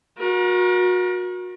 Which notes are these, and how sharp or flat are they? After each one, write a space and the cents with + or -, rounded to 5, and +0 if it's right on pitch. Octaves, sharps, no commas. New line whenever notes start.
F#4 -30 A#4 +35